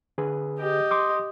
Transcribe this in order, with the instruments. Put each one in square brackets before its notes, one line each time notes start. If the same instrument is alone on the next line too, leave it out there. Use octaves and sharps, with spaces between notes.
[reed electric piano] D3 G#4 B4
[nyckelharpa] G4 D#5
[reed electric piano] C6 D6 D#6